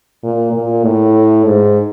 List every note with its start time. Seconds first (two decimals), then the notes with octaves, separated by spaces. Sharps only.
0.23 A#2
0.53 A#2
0.84 A2
1.46 G#2